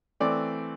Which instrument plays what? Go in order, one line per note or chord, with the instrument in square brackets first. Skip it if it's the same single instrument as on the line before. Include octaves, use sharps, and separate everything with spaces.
[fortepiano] E3 A3 C4 D5